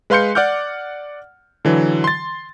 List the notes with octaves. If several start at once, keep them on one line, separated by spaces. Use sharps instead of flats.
G#3 B4 F5 C6 G6 C#7
D5 F#5 D6 F6 G6
D3 E3 F#3
C6 A6